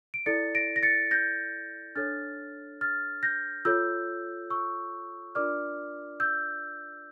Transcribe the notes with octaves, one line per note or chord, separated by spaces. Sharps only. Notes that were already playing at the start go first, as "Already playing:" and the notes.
D7
E4 A4 D5 A6 C#7
A#6 D7
A#6
A6 C#7
G6 A#6
D4 A4 C#5 F6 A6
F6 A6
G6 A#6
F4 A4 C#5 E6 G6
C#6 E6
D4 F4 A#4 D5 D6 F6
E6 G6